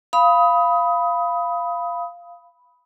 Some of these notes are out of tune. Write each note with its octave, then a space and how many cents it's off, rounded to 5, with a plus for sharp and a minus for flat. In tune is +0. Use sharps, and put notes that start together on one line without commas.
F5 -10 B5 +0 D#6 +20